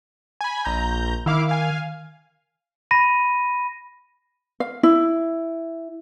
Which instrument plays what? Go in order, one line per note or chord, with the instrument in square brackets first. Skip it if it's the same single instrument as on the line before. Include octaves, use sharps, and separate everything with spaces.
[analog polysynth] G#5 B5
A#1 A#5 G6
[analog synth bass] D#3 [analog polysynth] E4 F5 D6
[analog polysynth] F5 G#5
[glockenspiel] B5 A#6 D#7
[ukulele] F5
E4